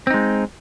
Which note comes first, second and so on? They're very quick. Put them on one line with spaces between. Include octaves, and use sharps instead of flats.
C4 D#4 G#3